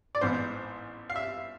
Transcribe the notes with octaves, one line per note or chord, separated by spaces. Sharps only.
D5
A1 G#2 E3 B3 C5
F5
E5